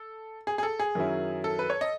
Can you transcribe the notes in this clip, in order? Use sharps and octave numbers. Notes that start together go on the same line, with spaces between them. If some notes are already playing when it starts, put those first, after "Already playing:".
Already playing: A4
G#4
G#4
A4
G#4
F#2 D#3 F#3 C#4 E4
A4
B4
C#5
D#5